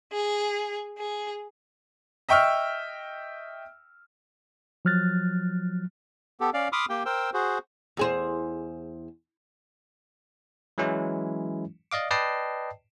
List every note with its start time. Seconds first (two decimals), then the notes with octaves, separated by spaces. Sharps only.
0.12 G#4
0.96 G#4
2.29 D#5 E5 G5 C#6 E6 F6
4.85 F3 F#3 F6 F#6 A6
6.40 B3 G4 A4
6.54 C#4 D5 F5
6.73 B5 C6 D6 D#6 F6
6.89 A#3 G4 G5
7.05 A#4 C5 G5 E6
7.34 F#4 G#4 C5
7.97 E2 G#4 C5
10.78 E3 F#3 G#3 C#4 E4
11.91 D5 D#5 F5 D6
12.11 B4 D5 D#5 G5 A5 C7